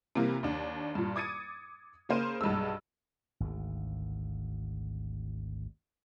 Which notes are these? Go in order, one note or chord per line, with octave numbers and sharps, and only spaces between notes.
C3 E3 G3 A#3
D#2 D4
G2 A#2
D6 D#6 G#6 A6 C#7 D#7
C#3 A#3 C5 F6 D#7
B1 G2 G#3 E6
G#1 D2